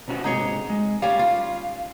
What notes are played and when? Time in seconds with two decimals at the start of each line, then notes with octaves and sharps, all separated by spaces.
0.08 B2 C#4 F#4
0.24 G#2 C3 D#4 G#4 C#5
0.70 G#3
1.02 G3 C#4 F5
1.19 F4